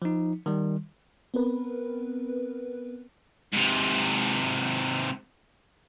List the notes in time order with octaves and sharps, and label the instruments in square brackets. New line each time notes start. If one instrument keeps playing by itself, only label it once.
[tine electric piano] F3 D#4
D#3 G3
[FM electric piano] B3 C4 A#4 B4
[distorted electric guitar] G#2 C3